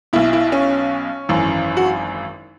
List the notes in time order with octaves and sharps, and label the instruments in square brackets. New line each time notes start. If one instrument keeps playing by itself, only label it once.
[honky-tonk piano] B1 B2 E4
E4
C#4
G#1 F#2 E3
F#4